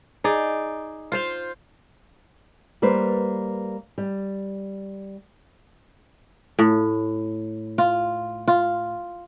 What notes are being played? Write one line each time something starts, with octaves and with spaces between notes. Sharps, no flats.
D#4 G#4 D5
F4 C5 F5
G3 A#3 B4 C5
G3
A2
F4
F4